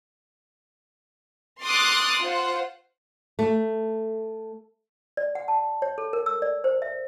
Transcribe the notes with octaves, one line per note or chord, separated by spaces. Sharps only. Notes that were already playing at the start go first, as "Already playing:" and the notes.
C6 D6 D#6 F6 F#6 A6
F4 C5 F#5
A3
D5
F#5
A5
C#5
A4
A#4
E6
D5
C5
E5